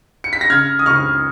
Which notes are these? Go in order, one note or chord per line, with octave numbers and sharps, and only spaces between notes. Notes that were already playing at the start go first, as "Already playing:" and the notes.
C#7
B6
A#6
C#3 F6 G#6
D#6
C#2 C#6 F6